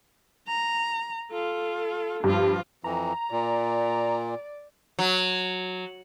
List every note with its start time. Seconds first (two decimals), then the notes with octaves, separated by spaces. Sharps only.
0.48 A#5
1.31 F4 A4
2.24 G2 F3 F4
2.84 F2 E3 A#5
3.32 A#2 D5
4.99 F#3